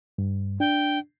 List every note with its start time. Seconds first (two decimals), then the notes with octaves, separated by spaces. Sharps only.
0.18 G2
0.60 D4 G5